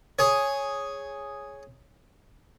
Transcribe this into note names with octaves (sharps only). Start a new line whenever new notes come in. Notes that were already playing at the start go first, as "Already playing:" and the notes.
G#4 C#5